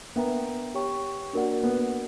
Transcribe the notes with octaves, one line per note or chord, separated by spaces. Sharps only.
B3 D4 A#4 E5 G5 A#5
G4 C#5 G5 C#6
A#3 D4 F#4 A#4 D5 F#5
B3